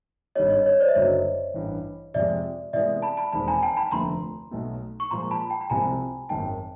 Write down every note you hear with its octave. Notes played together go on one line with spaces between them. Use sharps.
G#1 G2 D#3 G3 C#5 D#5
C#5 D#5
C#5
C5 D5
E5
F#1 F#2 D3 F#3 C#5 D#5
A1 G2 E3
F2 C3 F3 G#3 D5 E5
C3 E3 G#3 B3 E4 D5 E5
A5 B5
A5 B5
E1 D#2 D#3 G#3 C4 A5 B5
G#5 A#5
G5 A5
A5 B5
F1 D#2 D3 F3 A3 A#5 C6
B1 B2 F#3 A3
C#6
A#2 F3 G#3 A#5 C6
A5 B5
G5 A5
B5
C2 C3 F3 G#3 C4 G#5 A#5
G#1 F#2 D#3 G5 A5